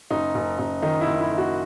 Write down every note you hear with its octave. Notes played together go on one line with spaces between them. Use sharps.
F#1 D#4
F#1
F#1
D#3 D#4
E4
F#1
E4
D#3
F#4